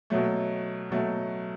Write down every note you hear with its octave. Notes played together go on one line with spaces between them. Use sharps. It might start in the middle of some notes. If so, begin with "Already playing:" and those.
B2 F#3 A3
B2 F#3 A3